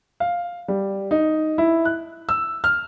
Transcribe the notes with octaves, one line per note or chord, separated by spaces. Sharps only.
F5
G3
D#4
E4
F#6
E6
F6